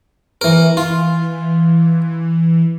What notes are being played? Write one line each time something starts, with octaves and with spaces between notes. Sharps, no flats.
E3 A#4
E3 F4